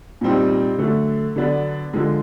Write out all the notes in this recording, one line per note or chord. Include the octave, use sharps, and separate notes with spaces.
A#2 G3 C4 D#4
D3 F#3 A3
D3 F#3 B3 D4
D3 F3 G#3